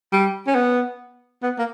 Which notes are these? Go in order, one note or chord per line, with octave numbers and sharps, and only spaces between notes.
G3
C#4
B3
B3
A#3